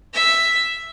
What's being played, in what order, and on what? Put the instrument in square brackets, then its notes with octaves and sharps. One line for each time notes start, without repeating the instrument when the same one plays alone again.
[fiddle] E5